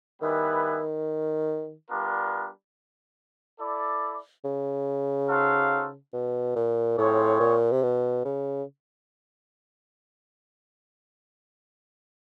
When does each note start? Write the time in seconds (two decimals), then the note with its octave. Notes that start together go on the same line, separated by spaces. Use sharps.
0.21 D#3 G3 B3 E4 G#4 B4
1.90 G3 B3 D4 F4 A#4
3.59 E4 A4 D5
4.45 C#3
5.29 D#4 F#4 A4 C5 F5
6.13 B2
6.56 A#2
6.97 A2 C4 F4 G#4 C#5
7.40 A#2
7.71 C3
7.83 B2
8.25 C#3